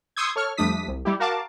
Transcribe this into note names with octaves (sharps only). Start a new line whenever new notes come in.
C6 C#6 D#6 E6 G6 G#6
A4 C#5 C#6 F6
F2 G3 A3 D4 D#6 B6
C2
G3 E4 G4
F#4 A#4 F5 A5 D6